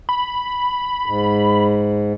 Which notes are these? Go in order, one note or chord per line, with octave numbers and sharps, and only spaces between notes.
B5
G#2